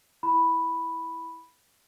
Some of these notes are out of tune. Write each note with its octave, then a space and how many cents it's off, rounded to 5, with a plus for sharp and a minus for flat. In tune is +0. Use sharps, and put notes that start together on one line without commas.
E4 +0 B5 +0